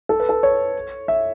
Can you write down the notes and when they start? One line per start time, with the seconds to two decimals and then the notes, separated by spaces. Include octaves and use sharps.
0.09 A4
0.20 B4
0.29 A4
0.43 C#5
1.08 E5